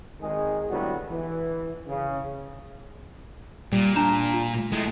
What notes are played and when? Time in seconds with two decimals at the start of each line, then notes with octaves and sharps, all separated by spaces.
0.21 G#1 D#3 G#3 G#4
0.70 A2 D3 F#3 G3 B3 F#4
1.10 E3
1.88 C#3
3.73 A#2 G3
3.96 D4 A5 A#5 E7
4.33 F4
4.72 A2 G#3 A3